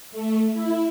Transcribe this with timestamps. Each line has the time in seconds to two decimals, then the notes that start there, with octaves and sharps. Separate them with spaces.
0.12 A3
0.54 E4